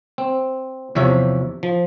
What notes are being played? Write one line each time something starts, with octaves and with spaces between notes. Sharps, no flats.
C4
E2 C3 F3 C#5 E5
F3